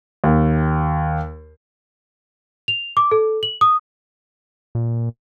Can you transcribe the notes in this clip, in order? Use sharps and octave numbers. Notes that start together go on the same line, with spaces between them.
D#2
F7
D6
A4
F#7
D#6
A#2